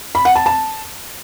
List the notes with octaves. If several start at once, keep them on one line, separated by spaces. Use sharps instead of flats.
B5
F#5
A5
A5